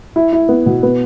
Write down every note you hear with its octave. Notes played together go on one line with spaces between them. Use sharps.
E4
E4
B3
B2
B3